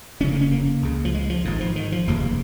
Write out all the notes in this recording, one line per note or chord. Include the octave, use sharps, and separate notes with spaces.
F1 F2 C#3 C#4
A#3
C#4
A#3
C#2 C#3
F3
G#3
F3
G#1 G#2
F3
D#3
F3
F1 D#2 C#3 A#3